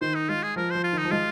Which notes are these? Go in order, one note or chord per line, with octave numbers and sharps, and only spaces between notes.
D#3 C5
D#4
G#3 F4
G#4
F3 A#4
F3 C5
F4
D#3 D#4
F3
G#3 F4